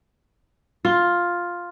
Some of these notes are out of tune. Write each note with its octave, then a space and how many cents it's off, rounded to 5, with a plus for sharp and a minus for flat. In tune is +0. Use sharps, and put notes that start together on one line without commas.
F4 +5